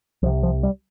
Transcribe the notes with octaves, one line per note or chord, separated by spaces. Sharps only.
C2 C3 F3
F3
G3